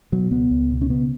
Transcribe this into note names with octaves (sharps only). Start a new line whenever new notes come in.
B2 F#3
C#2 B3
C#2
B2
C#4
C#3 B3